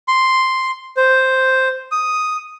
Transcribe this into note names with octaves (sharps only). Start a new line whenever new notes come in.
C6
C5
D#6